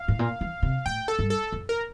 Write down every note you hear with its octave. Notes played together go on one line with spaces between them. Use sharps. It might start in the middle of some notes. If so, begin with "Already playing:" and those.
Already playing: F5
A2
A#2
E3
C3
A2 G5
A4
G2
A4
F2
A#4